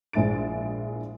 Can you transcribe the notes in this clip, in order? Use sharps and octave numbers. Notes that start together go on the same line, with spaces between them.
A#1 G#3 E4 A6 D7